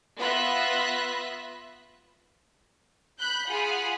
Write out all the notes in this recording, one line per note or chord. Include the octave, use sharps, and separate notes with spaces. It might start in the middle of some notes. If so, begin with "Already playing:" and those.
B3 F4 E5 B5 F#6 A#6
B5 F#6 G6
F4 G#4 F#5 B5